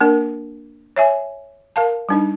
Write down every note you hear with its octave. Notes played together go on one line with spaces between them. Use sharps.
A#3 D4 A#4
C#5 E5 G#5
A#4 F5 A5
G3 D4 D#4